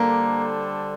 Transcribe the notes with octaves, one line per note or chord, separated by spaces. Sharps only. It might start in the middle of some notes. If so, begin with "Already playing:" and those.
Already playing: D3 G3 A#3 D4 A4 C5